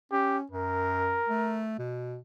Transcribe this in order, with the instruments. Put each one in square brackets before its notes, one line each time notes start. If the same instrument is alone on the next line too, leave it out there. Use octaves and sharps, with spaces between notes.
[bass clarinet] C#4 [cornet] G4
[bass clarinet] F#2 [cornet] A#4
[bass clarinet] A3
B2